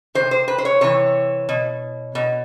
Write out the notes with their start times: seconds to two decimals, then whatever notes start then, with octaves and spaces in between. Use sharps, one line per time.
0.15 C3 E3 C5
0.31 C5
0.48 B4
0.58 C5
0.65 C#5
0.81 C3 E3 C#5
1.49 B2
2.15 B2